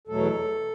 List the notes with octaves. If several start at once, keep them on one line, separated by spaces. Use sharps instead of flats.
E2 B2 F#3 A3 A4